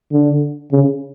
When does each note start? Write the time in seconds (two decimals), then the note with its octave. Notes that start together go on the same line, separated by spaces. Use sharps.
0.12 D3
0.72 C#3